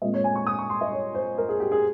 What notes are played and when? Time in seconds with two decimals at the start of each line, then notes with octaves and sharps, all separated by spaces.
0.02 A#2 G#3 C4 D#5
0.14 C#5
0.24 G#5
0.35 C#6
0.47 D#6
0.59 C#6
0.70 C6
0.81 D#5
0.92 C#5
1.15 C5
1.38 A#4
1.49 G#4
1.60 G4
1.72 G#4